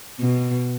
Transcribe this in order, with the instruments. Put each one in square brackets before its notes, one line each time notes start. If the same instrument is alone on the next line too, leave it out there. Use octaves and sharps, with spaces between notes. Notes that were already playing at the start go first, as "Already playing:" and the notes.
[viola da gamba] B2